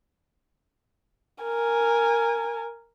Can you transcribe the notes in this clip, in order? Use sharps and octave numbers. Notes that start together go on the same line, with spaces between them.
A#4 G#5